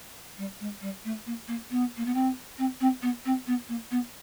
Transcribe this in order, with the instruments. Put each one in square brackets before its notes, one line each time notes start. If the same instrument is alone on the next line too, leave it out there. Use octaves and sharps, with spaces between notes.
[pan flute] G3
G#3
G3
A3
A#3
A#3
B3
A#3
B3
C4
C4
C4
B3
C4
B3
A#3
B3